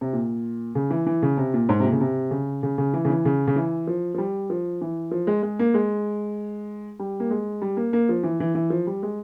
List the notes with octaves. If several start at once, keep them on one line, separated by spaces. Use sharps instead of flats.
C3
A#2
C#3
E3
E3
C#3
C3
A#2
G#2
C3
A#2
C#3
C3
C#3
C#3
C#3
E3
C#3
E3
C#3
C#3
E3
F3
F3
G3
F3
E3
F3
G#3
G#3
A#3
G#3
G3
A#3
G#3
G3
A#3
A#3
F3
E3
E3
E3
F3
G3
G#3